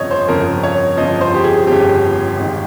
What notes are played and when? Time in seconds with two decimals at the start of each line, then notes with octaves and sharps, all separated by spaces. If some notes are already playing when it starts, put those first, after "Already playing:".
Already playing: G1 F2 C#3 F3 C#5 D#5
0.11 C5
0.28 G1 F2 C#3 F3 A#4
0.63 C#5
0.97 G1 F2 C#3 F3 D#5
1.21 C5
1.34 G4
1.44 G#4
1.67 G1 F2 C#3 F3 G4
2.37 G#1 G#2 D#3